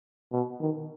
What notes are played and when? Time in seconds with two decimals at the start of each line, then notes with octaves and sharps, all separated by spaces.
0.32 B2
0.60 D#3